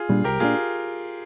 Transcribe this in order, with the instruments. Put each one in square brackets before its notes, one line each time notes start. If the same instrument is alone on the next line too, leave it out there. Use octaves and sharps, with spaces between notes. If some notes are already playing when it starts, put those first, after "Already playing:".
Already playing: [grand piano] F4 G#4
[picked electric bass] A#2 G3 D4
[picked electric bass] C2 [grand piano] G4 A#4
[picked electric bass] A#2 G3 D4 [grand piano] F4 G#4